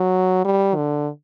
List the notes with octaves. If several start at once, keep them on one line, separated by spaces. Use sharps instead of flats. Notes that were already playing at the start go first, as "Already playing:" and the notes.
Already playing: F#3
G3
D3